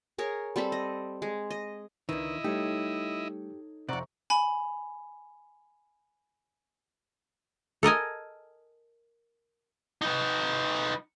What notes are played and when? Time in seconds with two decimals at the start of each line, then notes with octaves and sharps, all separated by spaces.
0.18 G#4 A#4 C#5
0.56 G3 C4 A4 B5
0.72 D#5
1.22 G#3
1.51 D#5
2.09 C#2 D3 D#3 D#4 E4 B4 D#5
2.44 G3 A3 D#4 G4 A4 C#5
3.89 F2 C3 C5 D5 F#5 A#5 C#6
4.30 G#5 B5
7.83 A4 A#4 D#5 G#5
10.02 D#4 B4